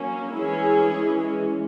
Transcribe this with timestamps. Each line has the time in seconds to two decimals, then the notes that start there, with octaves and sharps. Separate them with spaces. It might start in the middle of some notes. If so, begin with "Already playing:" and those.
Already playing: F#3 A#3 C#4
0.32 E3 G#3 C#4 E4 G#4
0.94 E3 G#3 C#4